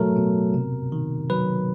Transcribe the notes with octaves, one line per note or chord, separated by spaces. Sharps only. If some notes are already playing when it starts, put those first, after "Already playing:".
Already playing: B2 F#3 A3 A4 A#4
B2
C3
D#3
F#3 B4